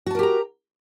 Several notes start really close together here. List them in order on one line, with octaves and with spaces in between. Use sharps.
F#4 A5 A#4 G4 A#5